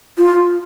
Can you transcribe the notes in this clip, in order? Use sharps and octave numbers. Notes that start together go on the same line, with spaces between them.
F4